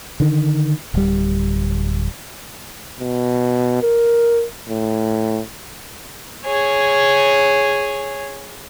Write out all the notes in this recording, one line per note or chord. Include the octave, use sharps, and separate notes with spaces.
D3 D#3
D1 G3
B2
A#4
A2
G#4 C#5